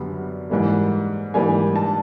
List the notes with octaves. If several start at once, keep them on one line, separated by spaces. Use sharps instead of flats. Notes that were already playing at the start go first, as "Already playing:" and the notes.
Already playing: F#2 D3 G3 B3
G#2 E3 G3 A#3
G#2 E3 G3 A#3 G#5
A5